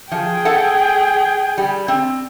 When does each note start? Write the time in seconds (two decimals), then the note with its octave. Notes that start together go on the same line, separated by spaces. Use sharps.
0.11 F3 G#4 G5
0.45 A4 F#5
1.58 G3
1.88 C4